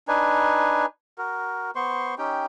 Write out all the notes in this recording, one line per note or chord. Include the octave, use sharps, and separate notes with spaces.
D4 D#4 B4 G#5
F#4 A#4
B3 C5 C6 C#6
C#4 D#4 G4 G5